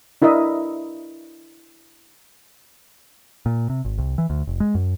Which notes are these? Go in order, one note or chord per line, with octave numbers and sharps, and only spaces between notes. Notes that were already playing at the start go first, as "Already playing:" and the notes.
D4 E4 A#4 D#5 E5
A#2
C3
G#1
C2
E3
D2
F1
G#3
F#2